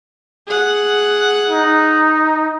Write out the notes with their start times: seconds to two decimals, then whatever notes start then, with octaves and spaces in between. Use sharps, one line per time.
0.47 G#4 F#5
1.50 D#4